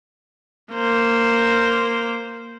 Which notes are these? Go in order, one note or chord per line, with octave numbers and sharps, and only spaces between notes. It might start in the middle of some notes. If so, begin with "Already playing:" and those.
A#3 C5